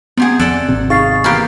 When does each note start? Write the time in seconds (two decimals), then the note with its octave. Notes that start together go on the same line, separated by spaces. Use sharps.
0.17 C3 B3 G4 G#4 F#5
0.39 F2 A4 D5 F#5 F#6
0.69 G#1 C3
0.90 D#4 G#4 F5 C#6 A6 C7
1.24 E3 A#3 B3 G4